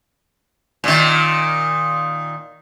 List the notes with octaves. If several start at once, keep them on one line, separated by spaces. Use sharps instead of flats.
A#2 D#3